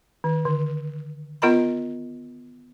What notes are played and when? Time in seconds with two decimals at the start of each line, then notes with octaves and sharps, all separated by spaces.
0.24 D#3
0.45 D3
1.42 B3 F4 A#4 D#5 A#5 B5